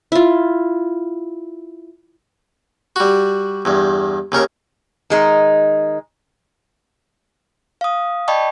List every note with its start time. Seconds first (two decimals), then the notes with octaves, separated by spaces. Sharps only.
0.12 E4 F4
2.96 G3 F#4
3.65 E2 G2
4.32 D#2 C#3 A#4 C#6
5.10 D#3 G#3 D#4
7.81 F5 D#6
8.28 D5 D#5 G5 A5 B5 C#6